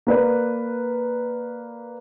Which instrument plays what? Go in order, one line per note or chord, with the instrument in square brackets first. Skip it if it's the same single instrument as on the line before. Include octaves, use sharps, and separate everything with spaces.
[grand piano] A#3 B4 D5